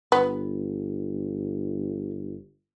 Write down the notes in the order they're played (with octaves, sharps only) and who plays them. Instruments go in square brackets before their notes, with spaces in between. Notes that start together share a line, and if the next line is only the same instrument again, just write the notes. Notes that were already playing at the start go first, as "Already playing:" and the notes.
[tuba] G1 [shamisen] B3